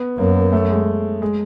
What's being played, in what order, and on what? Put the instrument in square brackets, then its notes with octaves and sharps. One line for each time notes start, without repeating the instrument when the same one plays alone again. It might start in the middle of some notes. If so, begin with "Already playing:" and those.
Already playing: [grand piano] B3
[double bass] F#2 [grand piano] A#3
[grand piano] A3
G#3
G#3